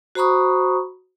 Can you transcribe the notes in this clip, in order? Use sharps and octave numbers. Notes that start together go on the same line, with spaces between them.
F#4 C5 A#5 B5 C#6 D#6